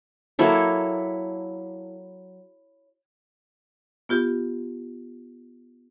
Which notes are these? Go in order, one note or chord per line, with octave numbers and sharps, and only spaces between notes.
F#3 A#3 E4 A4
B3 F4 G4